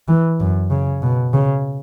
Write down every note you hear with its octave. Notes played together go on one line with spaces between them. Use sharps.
E3
F#2
C#3
B2
C#3